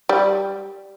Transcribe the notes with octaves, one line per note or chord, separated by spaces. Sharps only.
G3